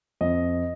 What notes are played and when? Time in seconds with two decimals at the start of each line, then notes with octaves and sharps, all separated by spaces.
0.21 F2 D#5